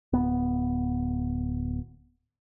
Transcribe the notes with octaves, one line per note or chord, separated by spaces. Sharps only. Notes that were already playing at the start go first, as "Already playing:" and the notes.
D1 B3